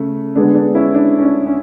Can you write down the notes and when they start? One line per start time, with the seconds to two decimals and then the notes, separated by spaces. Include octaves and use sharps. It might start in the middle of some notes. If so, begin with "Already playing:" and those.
Already playing: C#3 A3
0.35 D3 G#3 B3 D4
0.55 D4
0.74 C#4 E4
0.94 D4
1.19 C#4
1.24 D4
1.46 C#4